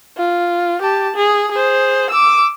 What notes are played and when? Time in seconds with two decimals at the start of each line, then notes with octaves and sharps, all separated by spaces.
0.17 F4
0.82 G4 A5
1.16 G#4
1.52 G#4 C5
2.10 D6 E6